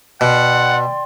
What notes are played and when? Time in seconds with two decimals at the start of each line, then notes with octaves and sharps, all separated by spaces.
0.21 B2 D5 F#5 G5 C6